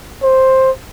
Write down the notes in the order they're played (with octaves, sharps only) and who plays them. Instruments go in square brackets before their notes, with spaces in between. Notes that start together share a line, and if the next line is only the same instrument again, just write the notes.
[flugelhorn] C5